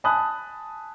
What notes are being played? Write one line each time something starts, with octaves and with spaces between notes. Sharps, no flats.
G#5 A5 B5 D#6 F#6